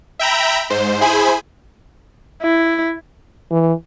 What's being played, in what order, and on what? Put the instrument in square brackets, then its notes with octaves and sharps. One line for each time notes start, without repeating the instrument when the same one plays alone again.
[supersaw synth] E5 G5 A#5 B5
G#2 C5
E4 G#4 C5 G#5 B5
[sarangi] E4
[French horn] E3